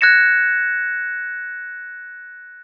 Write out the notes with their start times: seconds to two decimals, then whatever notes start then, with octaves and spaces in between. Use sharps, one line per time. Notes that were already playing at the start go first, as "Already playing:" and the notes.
0.01 F#6 G#6 A#6 C#7 E7